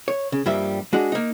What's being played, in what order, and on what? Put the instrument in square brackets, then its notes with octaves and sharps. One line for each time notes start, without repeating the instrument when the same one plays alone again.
[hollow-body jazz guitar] C#5
C#3
G2 F3 G3 A#3 E5
G#3 D4 F#4 D#5 F#5
A#3 D#4